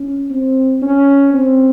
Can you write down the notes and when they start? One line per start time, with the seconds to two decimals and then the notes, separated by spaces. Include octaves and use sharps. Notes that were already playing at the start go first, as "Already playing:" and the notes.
Already playing: C#4
0.30 C4
0.82 C#4
1.33 C4